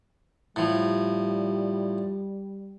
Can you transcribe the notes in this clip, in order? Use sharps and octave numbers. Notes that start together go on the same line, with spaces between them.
A2 F3 G3